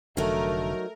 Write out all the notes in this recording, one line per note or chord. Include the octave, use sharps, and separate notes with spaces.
F1 D3 F#3 A3 D#4 A#4